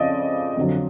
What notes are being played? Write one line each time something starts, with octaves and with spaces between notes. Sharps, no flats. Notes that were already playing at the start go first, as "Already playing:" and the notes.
Already playing: F2 C#3 F3 D5 D#5
F2 D3 F#3